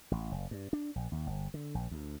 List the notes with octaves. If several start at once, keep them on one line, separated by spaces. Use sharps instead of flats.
A1
F#1
G2
D4
A#1
D#2
G1
D3
A#1
D2